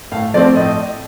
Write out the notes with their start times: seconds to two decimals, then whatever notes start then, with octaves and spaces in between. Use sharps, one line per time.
0.12 A2 F5
0.34 F3 A3 C4 D5
0.56 A2 D#5